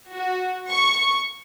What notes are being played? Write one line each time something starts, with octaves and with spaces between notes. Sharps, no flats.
F#4
C#6